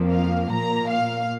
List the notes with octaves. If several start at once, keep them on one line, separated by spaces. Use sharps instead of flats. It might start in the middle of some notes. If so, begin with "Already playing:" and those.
Already playing: F2 F3 A#3
F5
A#2 A#3 A#5
F5